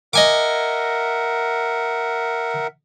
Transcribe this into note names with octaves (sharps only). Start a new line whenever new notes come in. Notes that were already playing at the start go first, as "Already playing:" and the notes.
A#4 D#5 E5 F#5 G#5 D6